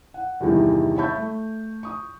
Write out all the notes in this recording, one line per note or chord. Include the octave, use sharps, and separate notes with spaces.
F#5
E2 G2 C3 D#3 E3
C#5 E5 A5 B5 C#6 G6
A3
C#6 D#6